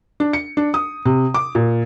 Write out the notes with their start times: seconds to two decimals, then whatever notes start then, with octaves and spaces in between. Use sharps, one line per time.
0.20 D4
0.33 C#7
0.57 D4
0.74 D#6
1.05 C3
1.34 D6
1.55 A#2